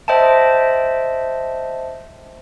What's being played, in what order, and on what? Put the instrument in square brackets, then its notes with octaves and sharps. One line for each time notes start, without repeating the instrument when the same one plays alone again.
[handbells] C5 D#5 E5 G5 A5